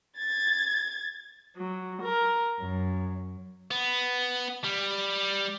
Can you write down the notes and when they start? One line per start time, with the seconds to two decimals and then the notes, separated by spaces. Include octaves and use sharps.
0.18 G#6 A6
1.57 F#3
2.02 A#4
2.60 F#2
3.71 B3
4.64 G3